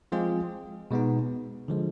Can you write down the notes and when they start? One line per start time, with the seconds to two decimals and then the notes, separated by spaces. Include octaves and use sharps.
0.12 F3 G#3 C4 F4 G#4
0.91 B2 G#3 B3 D#4
1.68 D3 F3 G#3